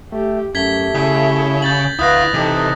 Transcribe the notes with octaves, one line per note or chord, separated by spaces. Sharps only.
A3 G4
F#2 A3 G4 G#6 B6 G7
C#3 E4
G6 A6 F#7
D2 E4 B4 F5 D#6 F#6 A#6
C3 E3 D#4 A4